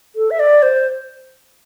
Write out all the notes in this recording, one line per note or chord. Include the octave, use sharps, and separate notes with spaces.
A4
E5
D5
C5